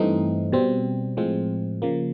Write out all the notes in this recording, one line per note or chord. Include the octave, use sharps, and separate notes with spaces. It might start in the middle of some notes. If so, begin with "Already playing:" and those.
Already playing: G2 E3 A3 C4 D#4
B2 G3 C4
A2 F3 G#3 C4
C#3 F3 A#3